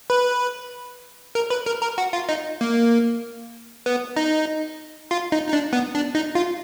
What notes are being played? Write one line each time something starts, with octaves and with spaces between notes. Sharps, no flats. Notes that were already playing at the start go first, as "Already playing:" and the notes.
B4
A#4
B4
A#4
A#4
F#4
F4
D#4
A#3
B3
D#4
F4
D#4
D#4
D4
B3
D4
D#4
F4